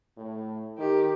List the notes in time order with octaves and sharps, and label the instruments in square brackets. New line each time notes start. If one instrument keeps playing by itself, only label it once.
[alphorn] A2
[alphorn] D#3 [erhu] G4